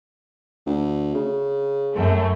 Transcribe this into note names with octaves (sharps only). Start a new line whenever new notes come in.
D2
C#3
F#2 A3